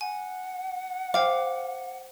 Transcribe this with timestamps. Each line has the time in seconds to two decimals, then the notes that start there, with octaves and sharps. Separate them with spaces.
0.01 F#5 G#5
1.14 C5 F5 G5 D6